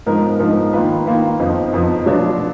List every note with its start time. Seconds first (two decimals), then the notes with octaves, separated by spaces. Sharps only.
0.06 G#2 F3 B3 D#4 A#4
0.39 G#2 F3 B3 D#4 A#4
0.73 D#3 A#3 F4 B4
1.06 D#3 A#3 F4 B4
1.40 F2 F3 B3 D#4
1.73 F2 F3 B3 D#4
2.06 B2 F#3 D4 F4